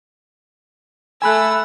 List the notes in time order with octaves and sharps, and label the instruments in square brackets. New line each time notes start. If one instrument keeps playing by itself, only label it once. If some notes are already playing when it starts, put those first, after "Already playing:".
[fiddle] A3 E6 [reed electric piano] G#5 B5 F#6